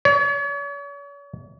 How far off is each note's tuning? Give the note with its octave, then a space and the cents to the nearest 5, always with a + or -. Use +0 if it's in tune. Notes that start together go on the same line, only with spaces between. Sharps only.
C#5 +40